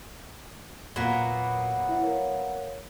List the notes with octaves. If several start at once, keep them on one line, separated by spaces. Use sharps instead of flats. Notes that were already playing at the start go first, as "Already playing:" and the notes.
E2 A#2 F#3 A#3 B3
E4 E5 F#5
A#4 C#5 F5